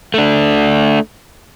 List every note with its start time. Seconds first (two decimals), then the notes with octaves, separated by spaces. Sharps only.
0.14 A3 D4